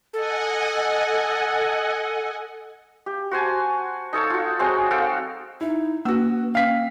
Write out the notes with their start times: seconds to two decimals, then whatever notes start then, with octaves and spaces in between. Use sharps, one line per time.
0.13 A4 D#5 F#5 G#5
3.06 G4
3.31 F#4 C5 G#5 A5
4.13 D#4 A4 C#5 A5
4.30 F4 F#4
4.59 F#3 G#3 C4 C5
4.91 F#4 A4 F5 G5
5.61 D#4 E4
6.05 A#3 F#4 B4 E6
6.55 C#4 F5 G5 B6